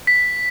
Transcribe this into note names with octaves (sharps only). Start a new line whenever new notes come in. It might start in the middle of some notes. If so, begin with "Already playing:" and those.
B6